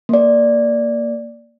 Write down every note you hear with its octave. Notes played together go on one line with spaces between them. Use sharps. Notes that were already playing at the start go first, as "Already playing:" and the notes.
A#3 D5